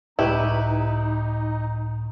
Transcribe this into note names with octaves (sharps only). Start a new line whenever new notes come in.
C#2 A2 D#4 E4 G4 B4 C#6